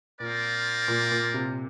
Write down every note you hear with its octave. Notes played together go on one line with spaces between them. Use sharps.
A#2 C4 F4 A#4 D5
A#2
A#2
C3